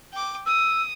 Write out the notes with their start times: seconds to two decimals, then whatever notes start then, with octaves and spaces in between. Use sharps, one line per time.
0.12 G5 D6
0.46 D#6 E6